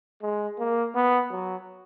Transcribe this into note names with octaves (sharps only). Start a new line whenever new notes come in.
G#3
A#3
B3
F#3